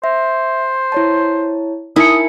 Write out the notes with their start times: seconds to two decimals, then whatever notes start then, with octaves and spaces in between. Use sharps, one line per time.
0.04 C5 E5
0.92 E4 C#5 A5
1.96 D#4 E4 A#4 G#5 A5 D#6 C#7